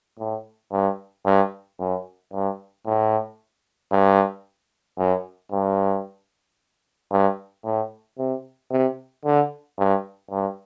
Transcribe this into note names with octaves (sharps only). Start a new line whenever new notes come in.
A2
G2
G2
F#2
G2
A2
G2
F#2
G2
G2
A2
C3
C3
D3
G2
G2